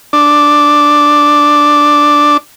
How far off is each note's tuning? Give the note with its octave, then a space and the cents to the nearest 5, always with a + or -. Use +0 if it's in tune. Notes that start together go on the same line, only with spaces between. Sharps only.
D4 +0